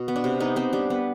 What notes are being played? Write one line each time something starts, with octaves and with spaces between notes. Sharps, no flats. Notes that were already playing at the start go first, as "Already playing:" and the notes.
Already playing: B2
B3
D4
C3
B3 D#4
B3 C4
G3 D4
B3